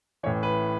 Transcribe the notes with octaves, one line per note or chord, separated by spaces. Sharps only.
A1 A2 E3 C#5
B4